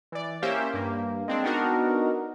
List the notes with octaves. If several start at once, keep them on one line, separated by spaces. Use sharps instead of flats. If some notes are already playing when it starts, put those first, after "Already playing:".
E3 D5
A#3 C#4 G4 C5 E5
G2 A#3
G#3 C4 D4
B3 D4 D#4 F#4 A#4